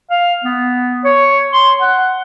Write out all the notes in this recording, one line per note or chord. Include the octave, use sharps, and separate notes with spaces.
F5
B3
C#5
C6
F#5